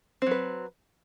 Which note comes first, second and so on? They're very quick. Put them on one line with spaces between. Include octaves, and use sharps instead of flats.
C4 F#3 B4